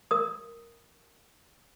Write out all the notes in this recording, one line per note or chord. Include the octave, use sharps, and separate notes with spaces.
A#4 D#6